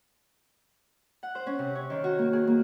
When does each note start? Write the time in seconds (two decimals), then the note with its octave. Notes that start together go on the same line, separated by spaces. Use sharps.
1.23 F#5
1.35 C5
1.47 C#4
1.59 C3
1.75 C#5
1.90 D#3
2.04 F#4
2.19 A#3
2.33 G#4
2.47 A#3